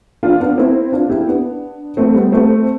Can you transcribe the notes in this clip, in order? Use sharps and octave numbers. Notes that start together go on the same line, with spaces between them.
D4 F4
B3 D4
C4 E4
D4 F4
E4 G4
B3 D4
A3 C4
G3 B3
A3 C4